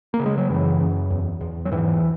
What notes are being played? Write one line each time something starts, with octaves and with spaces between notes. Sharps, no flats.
A#3
C#3
G#3
F#3
F#2 E3
F#2
E2
E2
F#3
G#2 E3